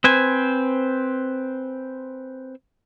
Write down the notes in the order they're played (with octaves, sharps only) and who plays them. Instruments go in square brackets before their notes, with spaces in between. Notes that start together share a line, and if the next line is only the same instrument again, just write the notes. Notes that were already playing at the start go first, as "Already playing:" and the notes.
[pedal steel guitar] C4 B4 C5 G#5